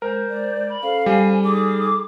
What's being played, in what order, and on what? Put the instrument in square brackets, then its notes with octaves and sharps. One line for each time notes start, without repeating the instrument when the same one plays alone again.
[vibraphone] G#3 [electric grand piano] A#4 [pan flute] C5
[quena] D5
[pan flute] B5
[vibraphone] C#4 A4 C5 [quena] F5
[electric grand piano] G3 [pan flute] G#5
[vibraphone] D#4 A4 [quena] G#4 [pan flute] D6